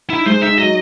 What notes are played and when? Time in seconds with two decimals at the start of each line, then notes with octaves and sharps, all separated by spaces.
0.10 D#4 E4
0.26 G#3 C5
0.42 D#4 E5
0.57 F#3 D#5